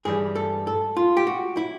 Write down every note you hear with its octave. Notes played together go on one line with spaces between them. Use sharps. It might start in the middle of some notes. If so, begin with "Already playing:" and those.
G2 E3 G3 G#4
A4
A4
F4
G4
F#4
E4